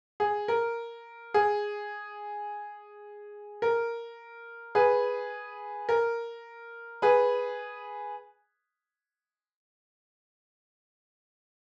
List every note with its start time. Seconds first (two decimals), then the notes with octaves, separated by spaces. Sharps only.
0.20 G#4
0.48 A#4
1.34 G#4
3.62 A#4
4.75 G#4 B4
5.89 A#4
7.02 G#4 B4